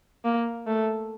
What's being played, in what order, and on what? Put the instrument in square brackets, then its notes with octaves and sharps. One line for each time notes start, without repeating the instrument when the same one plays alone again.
[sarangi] A#3
A3